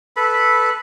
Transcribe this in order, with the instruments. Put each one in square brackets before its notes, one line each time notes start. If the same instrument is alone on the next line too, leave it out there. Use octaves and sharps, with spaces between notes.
[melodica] A4 B4 B5